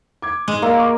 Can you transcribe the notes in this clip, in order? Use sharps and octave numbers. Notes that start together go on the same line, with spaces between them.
D6 G#6
G#2 G#3
A#3 A#4 D5 E6
C#6 D6